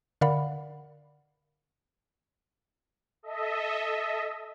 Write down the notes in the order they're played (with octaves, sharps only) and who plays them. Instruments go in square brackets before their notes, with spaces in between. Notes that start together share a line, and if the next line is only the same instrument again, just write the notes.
[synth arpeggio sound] D3 A#4 D5 F5 F#5 B5
[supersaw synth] A4 D#5 E5